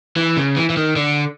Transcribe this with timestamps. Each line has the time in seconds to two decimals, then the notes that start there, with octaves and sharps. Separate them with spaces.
0.17 E3
0.37 C#3
0.57 E3
0.70 E3
0.77 D#3
0.96 D3